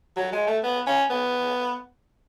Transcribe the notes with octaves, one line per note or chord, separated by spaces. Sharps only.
F#3
G#3
A3
B3
C#4
B3